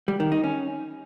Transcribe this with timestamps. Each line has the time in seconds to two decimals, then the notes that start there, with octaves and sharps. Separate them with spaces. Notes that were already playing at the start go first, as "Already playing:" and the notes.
0.08 G3
0.20 D#3
0.32 D#4
0.44 C#4